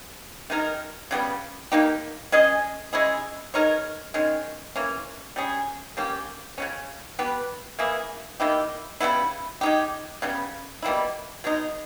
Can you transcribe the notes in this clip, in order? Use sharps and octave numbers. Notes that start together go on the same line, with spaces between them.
D#3 G#3 D#4 A#4
C#3 G3 B3
A#3 D#4 G4
G#3 C#4 G#4 D#5
G#3 C#4 E4 G#4
G#3 D#4 A#4 C#5
D#3 G#3 C#4
E3 A#3 C#4
G3 C#4 G#4
G3 A#3 C#4 G4
C#3 G3 C#4
B3 G4 B4
E3 A#3 E4 G#4
D#3 A#3 E4 G4
C#3 G3 B3 E4
G#3 D#4 G4
C#3 G3 B3
B2 G3 A#3 E4
B2 G#3 D#4